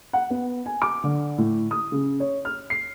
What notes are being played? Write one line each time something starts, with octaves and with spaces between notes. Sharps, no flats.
F#5
B3
G#5
D6
D3
A2
D#6
C#3
C#5
F6
C7